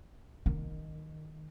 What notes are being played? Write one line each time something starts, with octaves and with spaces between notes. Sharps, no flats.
D#3